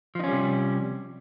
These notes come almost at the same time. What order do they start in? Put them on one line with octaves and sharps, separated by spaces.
F3 D#4 C#4 G3 C3